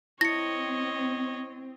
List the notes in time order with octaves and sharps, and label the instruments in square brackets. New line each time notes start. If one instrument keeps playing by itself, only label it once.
[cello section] C4 [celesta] E4 C#7 [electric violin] C#5 D#5 [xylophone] A#6